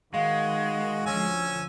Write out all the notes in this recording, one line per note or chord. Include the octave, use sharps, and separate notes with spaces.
D#3 G#3 F#4 F5
D2 D3 F3 C#4 G#5 E6